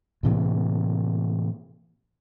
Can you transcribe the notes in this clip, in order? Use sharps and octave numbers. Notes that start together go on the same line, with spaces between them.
A2 C3 E3 A#3